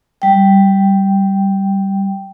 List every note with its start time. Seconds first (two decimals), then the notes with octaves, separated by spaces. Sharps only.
0.22 G3 G5